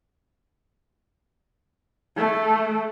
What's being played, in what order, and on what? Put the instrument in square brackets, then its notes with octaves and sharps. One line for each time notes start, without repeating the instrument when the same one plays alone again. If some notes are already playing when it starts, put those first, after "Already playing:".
[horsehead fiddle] A3